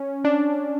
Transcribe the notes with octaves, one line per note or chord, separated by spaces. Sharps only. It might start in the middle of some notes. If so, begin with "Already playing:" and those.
Already playing: C#4
D4